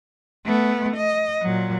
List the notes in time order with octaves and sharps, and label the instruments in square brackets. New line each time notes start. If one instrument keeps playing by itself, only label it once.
[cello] A3 B3
D#5
A#2 F#3